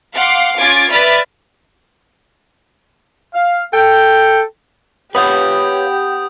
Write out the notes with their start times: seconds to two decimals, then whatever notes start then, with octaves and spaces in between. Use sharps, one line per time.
0.14 F5 F#5 C6 D6
0.58 C#4 F4 D6 G#6 A6 D7
0.91 B4 D5 E5 B5 F6 A6
3.33 F5
3.74 A4 G5
5.15 B3 G4 B4 C#5 F5 D#6 G6